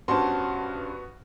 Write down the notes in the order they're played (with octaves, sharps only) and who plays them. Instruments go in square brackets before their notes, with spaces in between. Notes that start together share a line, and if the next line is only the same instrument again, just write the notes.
[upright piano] G2 C#4 C5 [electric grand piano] B3 F#4 [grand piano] A5 C6